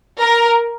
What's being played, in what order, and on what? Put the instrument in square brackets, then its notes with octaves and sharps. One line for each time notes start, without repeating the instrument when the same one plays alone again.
[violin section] A#4